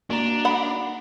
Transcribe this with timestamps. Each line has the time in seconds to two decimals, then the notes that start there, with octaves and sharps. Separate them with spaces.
0.10 A#3 D4 F#4 A#5
0.45 F#5 B5